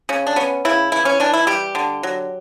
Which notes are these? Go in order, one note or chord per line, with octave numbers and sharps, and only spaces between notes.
C#3 C#4
D4
B3 C#4
C#3 E4
E3 E4
C#4
E3 D4
E4
G3 G4
D3
F#3